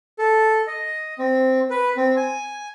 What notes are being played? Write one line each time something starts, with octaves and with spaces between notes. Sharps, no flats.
A4
D#5
C4
B4
C4
G#5